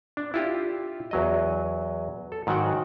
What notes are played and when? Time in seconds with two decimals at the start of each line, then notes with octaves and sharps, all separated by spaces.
0.17 D4
0.34 E4 F4 G4
1.11 E2 F#3 D#5
2.32 A4
2.47 G#2 D#3 F#3 F#4 F#5 G5